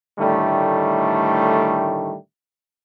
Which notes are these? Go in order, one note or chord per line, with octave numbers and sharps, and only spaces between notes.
A2 D3 D#3 G3 A3